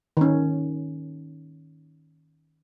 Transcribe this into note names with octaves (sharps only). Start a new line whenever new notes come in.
D#3 C#4